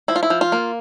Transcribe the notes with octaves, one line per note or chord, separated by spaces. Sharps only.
F3 E4
F4
E4
F3
F4
A#3